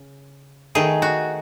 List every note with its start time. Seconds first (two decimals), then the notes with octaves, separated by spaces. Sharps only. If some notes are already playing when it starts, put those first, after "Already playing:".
Already playing: C#3
0.75 D#3 A3 D#4 G#4
1.02 F#4